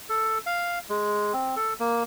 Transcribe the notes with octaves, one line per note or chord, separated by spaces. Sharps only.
A4
F5
G#3
C4
A4
A#3